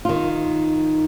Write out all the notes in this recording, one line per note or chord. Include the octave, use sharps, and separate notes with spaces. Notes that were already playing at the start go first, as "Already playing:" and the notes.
D#3 F4